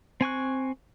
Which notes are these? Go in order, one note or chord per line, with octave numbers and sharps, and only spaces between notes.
C4 G#5 C#6 F#6